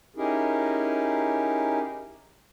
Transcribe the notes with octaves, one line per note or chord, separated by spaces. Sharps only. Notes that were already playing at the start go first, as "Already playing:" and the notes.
C#4 D#4 E4 G4 G#4 A#4